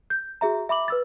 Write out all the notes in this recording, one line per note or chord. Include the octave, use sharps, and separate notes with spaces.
G6
F#4 G#4 E5 A#5
E5 B5 D6 F#7
B4 E6 A6